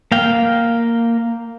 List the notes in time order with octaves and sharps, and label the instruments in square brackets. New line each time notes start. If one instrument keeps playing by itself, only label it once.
[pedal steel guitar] A#3 F5 G5